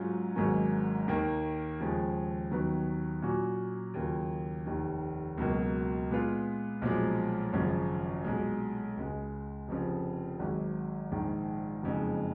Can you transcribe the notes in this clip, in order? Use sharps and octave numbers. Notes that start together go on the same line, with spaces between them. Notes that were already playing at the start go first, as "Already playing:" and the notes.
Already playing: G#2 F#3 C#4 F4
G#1 G#2 F#3 A#3 C#4
D#2 D#3 A#3
D#2 C#3 F3 G#3
D#2 D#3 F#3 B3
A#2 F#3 C#4 F#4
D#2 C#3 F#3 A#3 F4
F1 D#2 D#3
C#2 B2 F#3 A#3
A#2 G#3 B3 F4
B1 A#2 F3 G#3
G#1 F#2 C#3 F3
B1 A#2 G#3
C#2 C#3 G#3
F1 F2 C#3 F3
G#1 G#2 F#3
A#1 G#2 D#3
F#1 F2 C#3 G#3 D#4